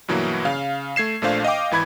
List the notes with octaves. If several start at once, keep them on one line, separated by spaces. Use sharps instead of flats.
G2 B2 E3 F#3 A#3 E4
C#3 F5
A3 G#6 C7 E7
A#1 A#2 A3 D4 C5 F5
D#5 F5 G5 D6
G#1 E3 B5 G#6